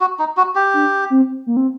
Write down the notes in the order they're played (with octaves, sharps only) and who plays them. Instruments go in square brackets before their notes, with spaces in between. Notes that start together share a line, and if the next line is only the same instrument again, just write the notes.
[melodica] F#4
D#4
F#4
G4
[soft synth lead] D4
C4
A#3
C4